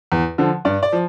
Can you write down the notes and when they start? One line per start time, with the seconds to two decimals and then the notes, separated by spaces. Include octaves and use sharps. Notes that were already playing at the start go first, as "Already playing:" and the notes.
0.12 E2
0.38 D3 F3
0.65 G2 D5
0.83 D5
0.92 F3